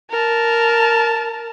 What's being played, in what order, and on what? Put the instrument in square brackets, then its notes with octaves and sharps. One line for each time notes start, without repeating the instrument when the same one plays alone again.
[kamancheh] A#4 A5